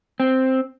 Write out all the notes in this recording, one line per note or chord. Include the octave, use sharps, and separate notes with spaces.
C4